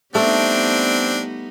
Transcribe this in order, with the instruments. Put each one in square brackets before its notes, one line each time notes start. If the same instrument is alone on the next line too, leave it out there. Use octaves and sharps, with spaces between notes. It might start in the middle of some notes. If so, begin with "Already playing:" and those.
[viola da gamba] G3 B3 D#4 [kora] A3 [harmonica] C4 D4